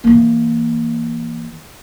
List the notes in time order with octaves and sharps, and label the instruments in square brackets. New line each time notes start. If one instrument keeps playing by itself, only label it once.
[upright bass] E3 A#3